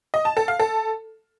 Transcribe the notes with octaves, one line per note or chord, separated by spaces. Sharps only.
D#5
A5
A4
F5
A4